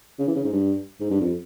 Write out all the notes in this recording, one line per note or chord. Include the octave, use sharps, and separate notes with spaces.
C#3
E3
C#3
G#2
G2
G#2
G2
F2